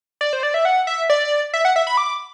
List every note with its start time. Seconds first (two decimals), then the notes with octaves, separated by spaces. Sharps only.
0.21 D5
0.33 C5
0.43 D5
0.54 E5
0.65 F#5
0.87 E5
1.10 D5
1.53 E5
1.65 F#5
1.76 E5
1.87 B5
1.97 D6